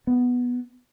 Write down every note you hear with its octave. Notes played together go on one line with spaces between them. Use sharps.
B3